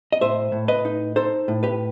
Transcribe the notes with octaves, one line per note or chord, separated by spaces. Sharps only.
D#5
A2 C5 E5
A2
B4 D#5
D#4
D#4 A4 C5
A2
G4 B4